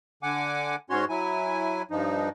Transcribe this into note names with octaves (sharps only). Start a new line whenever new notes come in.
D3 F#5 G#5 D6
G#2 C#4 F#4 C#5 C6
F#3 E4 G#5
G2 F3 D#4